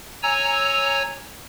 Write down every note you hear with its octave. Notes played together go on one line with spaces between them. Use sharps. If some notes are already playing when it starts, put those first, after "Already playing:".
C#5 G#5 A#5 E6